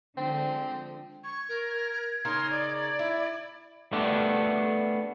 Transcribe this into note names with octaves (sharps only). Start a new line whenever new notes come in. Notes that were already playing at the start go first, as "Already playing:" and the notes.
D3 F3 G#3 C4
C#6 G#6
A#4
C#3 D#4 A#4 C6
D5
E4
A3 B3 D4 G4